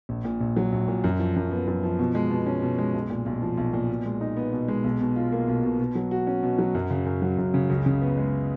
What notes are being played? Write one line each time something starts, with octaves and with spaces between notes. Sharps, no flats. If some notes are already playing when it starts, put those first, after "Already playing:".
A#1
A#2
A#1
F#3
A#1
A#2
F#2
F3
F#2
B3
F#2
F3
B2
G#3
B2
C#4
B2
G#3
B1
A#2
B1
F3
B1
A#2
B2
G#3
D#4
B3
B2
G#3
B1
B2
F4
A#3
B1
B2
B2
F#3
F#4
C#4
B2
F#3
F#2
C#3
F#2
F#3
F#2
C#3
C#2
C#3
B3
G#3